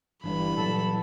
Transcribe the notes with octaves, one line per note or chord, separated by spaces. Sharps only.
G1 E3 G3 D4 B5
A#2 F#3 A4